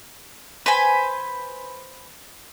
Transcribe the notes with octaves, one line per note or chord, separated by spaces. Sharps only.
B4 C5 G#5 B5